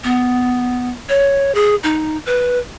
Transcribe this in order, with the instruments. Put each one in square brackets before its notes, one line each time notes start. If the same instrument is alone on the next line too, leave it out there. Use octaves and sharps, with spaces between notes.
[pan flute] B3
C#5
G#4
D#4
B4